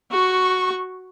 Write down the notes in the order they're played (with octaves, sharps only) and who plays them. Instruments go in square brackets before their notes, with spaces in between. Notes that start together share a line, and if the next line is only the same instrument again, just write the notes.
[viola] F#4 C#6